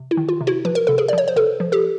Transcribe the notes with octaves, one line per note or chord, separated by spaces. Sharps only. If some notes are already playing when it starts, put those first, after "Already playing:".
Already playing: C3
E4
D#3
F4
C3
E4 F#4
F3 B4
A#4
C3 A4
G#4 A#4
D5
F3 C#5
C5
C3 A4 B4
F3
G4 A4